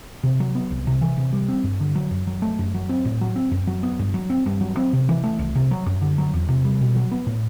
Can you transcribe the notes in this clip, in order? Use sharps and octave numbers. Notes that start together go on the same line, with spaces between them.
C3
F#3
B3
C2
C3
E3
C3
G3
C4
G2
D3
F#3
F#2
F#3
A3
F#2
F#3
C4
A2
F#3
C4
F#2
F#3
B3
G2
F#3
C4
G2
F#3
C4
C3
E3
A3
C2
C3
F#3
F#2
D3
F#3
E2
C3
G3
B2
F#3
B3
A2